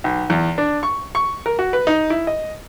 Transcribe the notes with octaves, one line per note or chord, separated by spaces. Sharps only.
B1
E2
D4
C#6
C#6
A#4
F#4
B4
D#4
E4
D#5